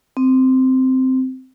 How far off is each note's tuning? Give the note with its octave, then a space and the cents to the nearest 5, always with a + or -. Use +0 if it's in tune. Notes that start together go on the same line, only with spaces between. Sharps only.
C4 -10